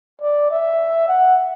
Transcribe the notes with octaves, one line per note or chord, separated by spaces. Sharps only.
D5
E5
F#5